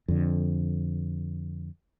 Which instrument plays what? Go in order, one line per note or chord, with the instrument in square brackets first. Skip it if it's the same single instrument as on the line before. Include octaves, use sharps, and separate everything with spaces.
[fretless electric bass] F2 D3